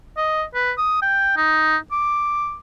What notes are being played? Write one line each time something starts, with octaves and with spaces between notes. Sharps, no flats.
D#5
B4
D#6
G5
D#4
D6